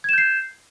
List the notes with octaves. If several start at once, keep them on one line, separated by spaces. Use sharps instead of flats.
G6 G#6 C7 E7